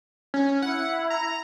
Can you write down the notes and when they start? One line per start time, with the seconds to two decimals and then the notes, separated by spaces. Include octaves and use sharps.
0.34 C#4
0.62 E4 F#5
1.10 A#5